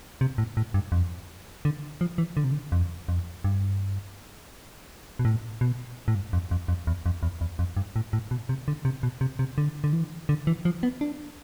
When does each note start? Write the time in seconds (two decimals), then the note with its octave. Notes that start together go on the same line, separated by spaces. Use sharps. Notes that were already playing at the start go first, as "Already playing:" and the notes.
0.21 C3
0.38 A2
0.57 A2
0.74 G2
0.92 F2
1.65 D3
2.01 F3
2.18 E3
2.37 D3
2.44 C3
2.52 D3
2.72 F2
3.08 F2
3.44 G2
5.19 B2
5.25 A2
5.61 B2
6.08 A2
6.15 G2
6.33 F2
6.51 F2
6.68 F2
6.87 E2
7.06 F2
7.23 E2
7.41 E2
7.59 F2
7.77 G2
7.96 A2
8.13 A2
8.31 B2
8.49 C3
8.68 D3
8.85 C3
9.03 B2
9.21 C3
9.39 C3
9.58 D3
9.84 D3
9.93 E3
10.29 D3
10.47 E3
10.65 F3
10.83 B3
11.01 D4